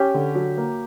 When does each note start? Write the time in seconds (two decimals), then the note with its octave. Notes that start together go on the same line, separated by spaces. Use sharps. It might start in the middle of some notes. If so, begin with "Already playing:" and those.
Already playing: C#4 G4
0.14 D3
0.35 F#3
0.58 A#3